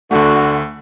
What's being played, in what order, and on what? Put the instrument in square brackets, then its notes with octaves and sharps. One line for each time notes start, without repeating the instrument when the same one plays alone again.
[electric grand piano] D2 A3 [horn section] D3 F#4